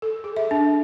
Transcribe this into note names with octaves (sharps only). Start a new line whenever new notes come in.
A4
G#4
E5
D4